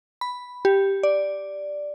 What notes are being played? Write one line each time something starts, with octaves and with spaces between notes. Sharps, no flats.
B5
G4
D5